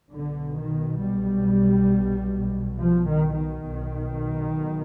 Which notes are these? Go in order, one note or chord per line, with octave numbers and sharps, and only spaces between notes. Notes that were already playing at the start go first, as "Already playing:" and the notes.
B1 B2 D3
D#3
G3
F3
D#3
D#3
B1 B2